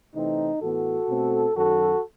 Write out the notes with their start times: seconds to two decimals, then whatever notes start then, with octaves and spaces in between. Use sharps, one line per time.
0.14 C3 E3 A3 C4 D#4
0.61 A2 E3 B3 F#4 A4
1.09 B2 A3 C4
1.56 F#2 D#3 F#3 F#4 A4